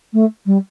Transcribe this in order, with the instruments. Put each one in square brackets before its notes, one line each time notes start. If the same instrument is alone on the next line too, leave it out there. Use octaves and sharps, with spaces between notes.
[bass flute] A3
G3